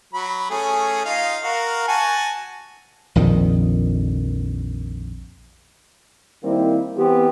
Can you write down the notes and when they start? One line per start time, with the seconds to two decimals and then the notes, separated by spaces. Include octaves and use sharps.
0.13 F#3 B5
0.50 A3 C#4 G#4
1.05 D#4 F4 F5
1.43 F#4 A#4 F5
1.88 F#4 G#5 A5
3.15 A#1 F2 D#3
6.44 D#3 G3 A#3 C4 E4
6.96 E3 B3 C4 G4